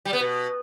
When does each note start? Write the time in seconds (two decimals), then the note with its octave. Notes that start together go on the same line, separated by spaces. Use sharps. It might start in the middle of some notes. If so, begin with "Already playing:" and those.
0.05 G3
0.13 B3
0.21 B2